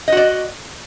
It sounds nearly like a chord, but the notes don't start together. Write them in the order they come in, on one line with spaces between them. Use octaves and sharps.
D#5 F#4 D5